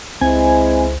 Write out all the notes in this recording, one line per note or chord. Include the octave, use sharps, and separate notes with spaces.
C#2 G#3 C4 E4 C5 G#5